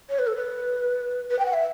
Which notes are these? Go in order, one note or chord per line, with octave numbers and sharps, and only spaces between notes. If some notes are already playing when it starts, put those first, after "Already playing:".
C#5
B4
A4
B4
B4
G5
F#5
E5